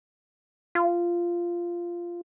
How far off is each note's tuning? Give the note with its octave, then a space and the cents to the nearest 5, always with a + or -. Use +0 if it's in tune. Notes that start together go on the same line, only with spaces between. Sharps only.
F4 -10